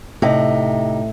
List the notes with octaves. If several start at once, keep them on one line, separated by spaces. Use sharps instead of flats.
A2 C3 D#4